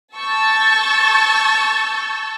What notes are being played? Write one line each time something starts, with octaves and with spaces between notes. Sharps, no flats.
A5 C#6 E6 G6 A6